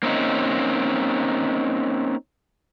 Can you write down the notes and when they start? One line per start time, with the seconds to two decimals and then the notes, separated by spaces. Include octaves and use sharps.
0.03 A#3 C4 C#4 D#4